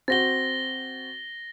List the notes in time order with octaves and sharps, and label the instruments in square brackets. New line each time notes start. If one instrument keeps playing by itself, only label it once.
[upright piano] C4 F#4 [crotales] A6 A#6 G7